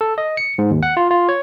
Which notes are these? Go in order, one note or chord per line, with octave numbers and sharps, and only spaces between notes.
A4
D#5
C#7
G#2
D#2
F#5
F4
F4
C#5